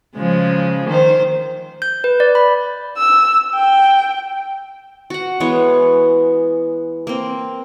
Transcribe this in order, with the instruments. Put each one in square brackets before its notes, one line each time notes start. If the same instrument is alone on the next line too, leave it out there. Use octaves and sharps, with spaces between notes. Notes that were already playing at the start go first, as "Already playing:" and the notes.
[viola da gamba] C#3 F3 G#3
D#3 C5
[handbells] G6
B4
D5
B5
[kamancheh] E6
G5
[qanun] F#4 F#5
E3 G#3 B3 C#5
A#3 C4